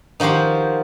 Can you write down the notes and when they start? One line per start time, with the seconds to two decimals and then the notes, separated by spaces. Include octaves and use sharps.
0.20 D#3 F3 F#4 G4 C5